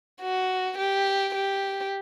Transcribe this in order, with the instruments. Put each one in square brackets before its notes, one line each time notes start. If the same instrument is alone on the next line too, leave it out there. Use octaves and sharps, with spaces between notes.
[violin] F#4
G4
G4